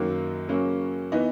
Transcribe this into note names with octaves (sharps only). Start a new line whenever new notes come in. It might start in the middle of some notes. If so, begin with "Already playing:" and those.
Already playing: F#2 D#3 F#3 A#3
C#3 F#3 A#3 C#4
E3 B3 D#4